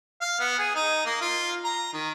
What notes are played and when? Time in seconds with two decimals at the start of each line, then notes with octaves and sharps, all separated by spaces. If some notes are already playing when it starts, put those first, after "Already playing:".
0.21 F5
0.40 B3
0.58 G#4
0.75 D#4
1.06 A#3
1.21 F4
1.64 A#5
1.93 D#3